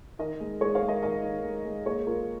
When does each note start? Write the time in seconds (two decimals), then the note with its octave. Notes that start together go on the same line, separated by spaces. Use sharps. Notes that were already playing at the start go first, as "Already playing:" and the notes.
0.19 D#3 A#4 D#5
0.40 G#3
0.61 G#3 G#4 C#5
0.75 C#5 F5
0.82 G#3
0.88 A#4 D#5
1.02 D#3 A#4 D#5
1.23 D#3
1.44 G#3
1.65 G#3
1.86 A#3 G#4 C#5
2.07 A#3 F4 A#4